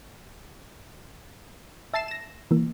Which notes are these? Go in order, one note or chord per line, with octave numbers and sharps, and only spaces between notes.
E5 A5 A6 C7 E7
A#6 E7
E3 A#3